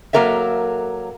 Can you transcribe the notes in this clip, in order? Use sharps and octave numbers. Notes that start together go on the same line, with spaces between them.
F#3 A#3 A4 A#4 D5 E5